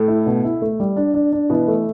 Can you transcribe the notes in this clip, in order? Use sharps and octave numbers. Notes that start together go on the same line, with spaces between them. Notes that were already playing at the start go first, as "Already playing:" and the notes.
Already playing: A2 A3
E4
B2
E4
A3
G3
D4
D4
D4
B2 E3 B3
A3